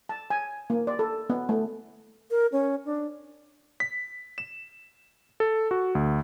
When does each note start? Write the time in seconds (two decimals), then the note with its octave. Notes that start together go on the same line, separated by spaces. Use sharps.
0.09 A5
0.30 G#5
0.70 A#3
0.87 D5
0.99 A4
1.30 B3
1.49 A3
2.31 A#4
2.52 C#4
2.86 D4
3.80 B6
4.38 E7
5.40 A4
5.71 F#4
5.95 D2